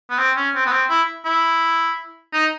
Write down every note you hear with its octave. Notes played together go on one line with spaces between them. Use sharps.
B3
C4
C#4
C4
B3
C4
E4
E4
D#4